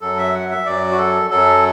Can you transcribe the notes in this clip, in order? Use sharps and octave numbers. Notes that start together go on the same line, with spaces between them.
F#2 F#3 A4
E5
F#5
E5
F#2 F#3 D5
F#4
A4
F#2 F#3 A4